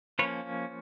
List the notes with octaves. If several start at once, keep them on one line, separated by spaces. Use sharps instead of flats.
F3 A#3 C#4 B4 C#5